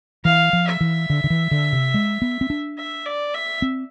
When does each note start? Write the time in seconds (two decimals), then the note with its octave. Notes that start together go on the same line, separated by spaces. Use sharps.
0.24 E3 F5
0.53 F3
0.67 E5
0.81 E3
1.10 D3
1.24 D3
1.30 E3
1.51 D3
1.73 C3
1.94 G#3
2.22 B3
2.41 C4
2.50 D4
2.78 E5
3.06 D5
3.34 E5
3.62 C4